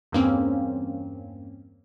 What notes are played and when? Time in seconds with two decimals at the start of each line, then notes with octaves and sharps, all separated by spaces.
0.12 E2 G2 A#3 C4 C#4